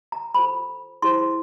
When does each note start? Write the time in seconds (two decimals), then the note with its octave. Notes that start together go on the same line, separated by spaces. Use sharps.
0.12 A#5
0.34 F4 A4 C5 B5
1.02 E4 G#4 C5 C6